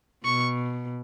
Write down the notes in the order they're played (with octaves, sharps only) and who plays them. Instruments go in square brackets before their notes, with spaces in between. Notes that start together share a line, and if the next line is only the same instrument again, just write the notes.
[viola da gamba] B2 [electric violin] C#6